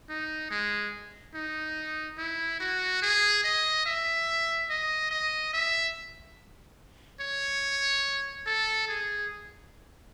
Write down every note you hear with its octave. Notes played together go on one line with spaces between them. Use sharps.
D#4
G#3
D#4
E4
F#4
G#4
D#5
E5
D#5
D#5
E5
C#5
A4
G#4